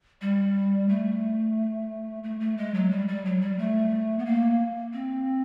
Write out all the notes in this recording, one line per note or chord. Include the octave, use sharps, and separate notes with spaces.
G3
A3
A3
A3
G#3
F#3
G3
G3
F#3
G3
A3
B3
A#3
C4